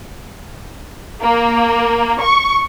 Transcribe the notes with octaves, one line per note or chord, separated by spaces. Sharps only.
A#3
C#6